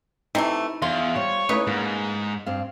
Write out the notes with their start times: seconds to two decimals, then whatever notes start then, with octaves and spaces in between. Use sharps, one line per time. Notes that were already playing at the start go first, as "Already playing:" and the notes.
0.35 C3 E3 A3 D#4 E4
0.82 E2 F4
1.16 G3 C5 C#5
1.49 C#3 A3 A#3 D#4 E4 B4
1.67 G#2 A#3
2.46 G2 C4 F5